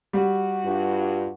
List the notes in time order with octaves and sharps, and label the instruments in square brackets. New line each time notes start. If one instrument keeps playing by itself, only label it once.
[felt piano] G3 [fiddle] F#4
[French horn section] G2 F4